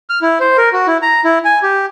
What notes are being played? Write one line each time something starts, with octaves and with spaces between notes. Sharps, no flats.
F6
E4
C5
A#4
F#4
E4
A#5
E4
G#5
G4